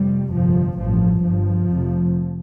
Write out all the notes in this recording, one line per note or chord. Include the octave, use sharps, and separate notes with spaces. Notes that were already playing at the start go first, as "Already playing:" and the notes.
Already playing: F1 F2 C3 G3
G1 F2 C3 F3
A1 G2 F3
G1 G2 F3
F1 F2 C3